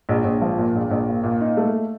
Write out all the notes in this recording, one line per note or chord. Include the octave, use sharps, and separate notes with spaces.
A#1
A#1
F3
A#2
A#1
A#1
A#2
A#2
D#4
A3